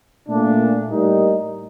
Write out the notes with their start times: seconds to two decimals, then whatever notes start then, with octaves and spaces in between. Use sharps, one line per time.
0.28 A#2 A3 D4
0.88 A2 G3 A#3 D#4